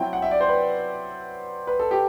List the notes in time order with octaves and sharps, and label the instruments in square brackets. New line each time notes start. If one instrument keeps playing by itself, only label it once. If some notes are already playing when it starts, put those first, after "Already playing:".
Already playing: [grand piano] F#3 C4 E4 G5
F#5
E5
D5
C5
B4
B4
A4
G4